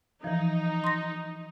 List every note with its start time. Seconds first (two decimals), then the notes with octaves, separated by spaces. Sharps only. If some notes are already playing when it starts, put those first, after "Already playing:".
0.24 E3 F3 D#4
0.84 C6 A#6